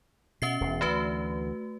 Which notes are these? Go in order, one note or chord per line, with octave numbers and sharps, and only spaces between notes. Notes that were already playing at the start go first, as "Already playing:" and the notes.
B2 C#4 E5 C7
E1 E2
D2 E3 A3 F#4 B4